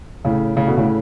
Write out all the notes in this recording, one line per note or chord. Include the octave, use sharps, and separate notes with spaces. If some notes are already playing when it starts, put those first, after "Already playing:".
A2 C#3
A2 C#3
B2 D3
A2 C#3